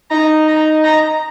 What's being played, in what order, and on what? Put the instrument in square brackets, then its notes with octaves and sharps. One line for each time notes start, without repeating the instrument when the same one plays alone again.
[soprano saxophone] D#4 [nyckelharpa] A#5
[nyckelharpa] A#5
A#5